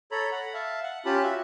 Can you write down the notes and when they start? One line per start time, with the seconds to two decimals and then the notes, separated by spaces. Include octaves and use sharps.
0.12 A4 C#5 A#5 B5
0.32 F#5 B5
0.54 E5 F5 A5
0.83 F#5
1.05 C#4 F4 G4 A5 B5
1.23 F#4 E5